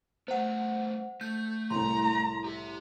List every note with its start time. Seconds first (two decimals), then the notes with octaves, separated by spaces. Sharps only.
0.28 A3 B3 C5 F#5
1.21 A3 G6
1.70 C2 A2 A#5 C6
2.45 G4 E5